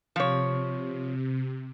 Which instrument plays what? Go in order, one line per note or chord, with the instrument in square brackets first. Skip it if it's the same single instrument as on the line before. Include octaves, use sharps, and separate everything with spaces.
[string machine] C3 [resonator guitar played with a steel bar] F3 C#5